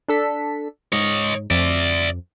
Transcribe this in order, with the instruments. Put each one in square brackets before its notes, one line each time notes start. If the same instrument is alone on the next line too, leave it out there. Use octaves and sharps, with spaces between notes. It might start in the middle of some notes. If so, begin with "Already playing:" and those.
[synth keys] D4 A4 B6
[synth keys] G#2 [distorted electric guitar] C#5 D#5
[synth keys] F2 [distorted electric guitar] D5 E5